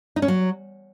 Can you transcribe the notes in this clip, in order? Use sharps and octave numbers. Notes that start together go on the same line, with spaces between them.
D#4
C#4
F#3